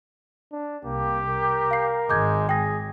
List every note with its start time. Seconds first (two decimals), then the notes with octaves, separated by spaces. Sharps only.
0.52 D4
0.84 C2 A#3 G4
1.28 A#4
1.71 F5 C7
2.10 G#1 G#3 D6 G6 G#6
2.49 G#4 G5 A#6